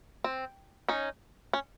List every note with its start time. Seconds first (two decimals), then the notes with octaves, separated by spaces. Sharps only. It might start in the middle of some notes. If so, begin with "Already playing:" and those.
0.24 C4
0.89 C#4 D#4
1.53 C#4